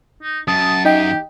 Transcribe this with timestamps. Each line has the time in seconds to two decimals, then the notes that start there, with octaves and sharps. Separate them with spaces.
0.23 D#4
0.48 F#2 A5 D#6
0.85 D#4 G4 D#5 G5